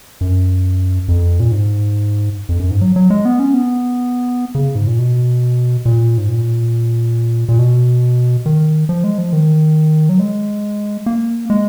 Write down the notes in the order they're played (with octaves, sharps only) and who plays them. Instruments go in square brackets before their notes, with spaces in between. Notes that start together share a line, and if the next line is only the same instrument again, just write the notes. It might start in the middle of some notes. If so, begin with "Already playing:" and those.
[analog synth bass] F#2
F2
A#2
G#2
F2
F#2
G#2
F#3
F#3
G#3
B3
C#4
B3
C#3
G#2
A#2
B2
A#2
G#2
A#2
A#2
B2
D#3
F3
G#3
F3
D#3
F#3
G#3
A#3
G#3